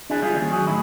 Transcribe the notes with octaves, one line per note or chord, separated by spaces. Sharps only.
D4 E4 G#4
G3 F4 G#4
D#2 C#4
F#3 G#4
A2 D#4 E4